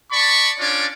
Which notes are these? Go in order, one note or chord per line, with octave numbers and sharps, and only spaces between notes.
D5 A5 B5 C#6
C#4 D4 F4 C#5 D5